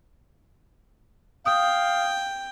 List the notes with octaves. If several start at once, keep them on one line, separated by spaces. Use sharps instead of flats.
F5 G5 D#6